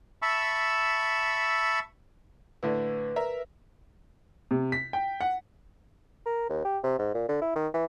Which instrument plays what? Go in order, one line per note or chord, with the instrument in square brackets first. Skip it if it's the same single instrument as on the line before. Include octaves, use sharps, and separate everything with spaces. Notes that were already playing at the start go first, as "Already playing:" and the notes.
[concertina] E5 A5 B5 C#6 E6
[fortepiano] A2 D3 E4 [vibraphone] B4
[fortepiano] A#4 E5 A#5
[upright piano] C3
B6
G5
F#5
[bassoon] A#4
D#2
G4
C3
G#2
A#2
D3
E4
D#3
E3